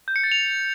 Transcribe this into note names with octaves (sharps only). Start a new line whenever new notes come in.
G6
C#7
A6
F7